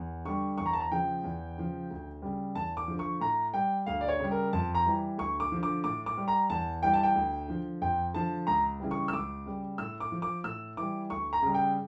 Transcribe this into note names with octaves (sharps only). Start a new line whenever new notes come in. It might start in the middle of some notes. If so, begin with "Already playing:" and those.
Already playing: E2
D3 G3 C#6
E2 C#6
A#5
A5
A#5
C#3 F3 G5
E2
C#3 F3
D2
C#3 G3
E2 A5
D6
D3 F3
C#6
A2 A#5
G3 G5
D2 F5
D5
C#5
C#3 G3
A#4
F2 A5
A#5
E3 G3
D2 C#6
D6
D3 F3
D6
A2 D6
D6
G3
A#5
E2 A5
E3 G3 G5
A5
G5
D2
D3 F3
F2 G5
D3 F3 A5
C#2 A#5
C#3 E3 G3
C#6
E6
C#2 D6
C#3 G3
A2 E6
D6
F3
D6
A2 E6
E3 G3 D6
D2 C#6
A#5
C#3 G3
G5